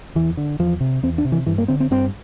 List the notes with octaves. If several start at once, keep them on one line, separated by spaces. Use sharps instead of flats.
E2 E3
D3
E2 F3
C3
E2 C4
D4
C3
E3
G2 E3
A#3
D3 C4
C4
G2 C4